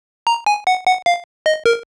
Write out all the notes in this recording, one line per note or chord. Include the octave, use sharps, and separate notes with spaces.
A#5
G#5
F#5
F#5
F5
D#5
A#4